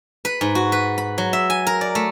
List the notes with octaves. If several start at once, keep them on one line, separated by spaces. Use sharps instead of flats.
B4
G#2
F#4
B4
B5
F#3
E5
G#5
A#4
D5
A3